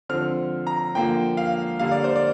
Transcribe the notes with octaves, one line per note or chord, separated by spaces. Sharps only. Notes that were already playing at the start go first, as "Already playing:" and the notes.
D3 F3 C4 F6
A#5
D3 F3 A#3 G5
F5
D3 G3 A#3 F5
D5
C5
D5